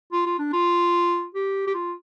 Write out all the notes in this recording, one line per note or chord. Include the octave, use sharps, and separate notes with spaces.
F4
F4
D4
F4
G4
G4
F4